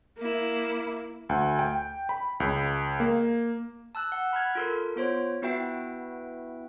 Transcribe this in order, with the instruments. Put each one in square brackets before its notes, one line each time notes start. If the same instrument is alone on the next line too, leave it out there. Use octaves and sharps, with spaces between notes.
[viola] A#3 E4
[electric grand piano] D2
G5
B5
C#2
A#3
[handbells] A5 E6 F#6
F#5
B5 F6 F#6 G#6
F4 A4 A#4
B3 F4 C5 C#5
B3 E4 F#4 B4 E5 G5